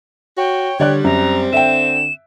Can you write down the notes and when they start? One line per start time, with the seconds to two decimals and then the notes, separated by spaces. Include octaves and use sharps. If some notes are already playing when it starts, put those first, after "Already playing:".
0.37 F#4 C#5 G5
0.80 D3 G3 C#5 D5 F#6
1.04 F#2 C4 A#5
1.53 D3 E5 G5 E7